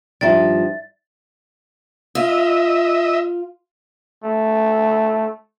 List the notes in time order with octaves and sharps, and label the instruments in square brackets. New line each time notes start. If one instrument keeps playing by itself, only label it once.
[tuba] G2 [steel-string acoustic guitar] D#3 F3 [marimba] D5 E5 [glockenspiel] A6
[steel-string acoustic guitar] F4 [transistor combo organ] D#5 E5
[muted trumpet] A3